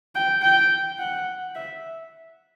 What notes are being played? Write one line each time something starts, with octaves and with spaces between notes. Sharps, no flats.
G5
G5
F#5
E5